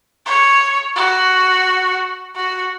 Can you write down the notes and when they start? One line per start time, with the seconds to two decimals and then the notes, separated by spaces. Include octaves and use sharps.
0.26 C#5
0.96 F#4
2.36 F#4